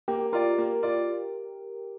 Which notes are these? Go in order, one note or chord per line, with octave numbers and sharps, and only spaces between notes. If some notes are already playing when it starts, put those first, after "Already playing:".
A#3 G4
F4 A#4 D5
A#3
F4 D5